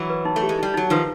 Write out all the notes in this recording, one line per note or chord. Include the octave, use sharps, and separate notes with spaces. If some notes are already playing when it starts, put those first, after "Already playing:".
Already playing: E3 F#3
B4
D#4
A3
G4
G#3
G3 D#4
F#3 D#4
D#3 F3 B4